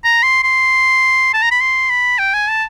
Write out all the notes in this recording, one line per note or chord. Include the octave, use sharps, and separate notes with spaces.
A#5
C6
C6
A5
A#5
B5
C6
B5
G5
G#5
A5